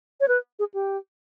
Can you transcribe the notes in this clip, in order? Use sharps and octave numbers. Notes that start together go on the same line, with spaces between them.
C#5
B4
G#4
G4